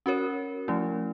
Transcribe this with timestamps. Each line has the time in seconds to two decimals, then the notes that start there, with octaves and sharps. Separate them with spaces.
0.06 C#4 F#4 A#4 C#5
0.68 F3 A3 C#4 E4